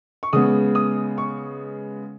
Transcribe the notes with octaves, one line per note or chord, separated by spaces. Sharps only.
C#6
C#3 G#3 B3 D#6
D#6
C#6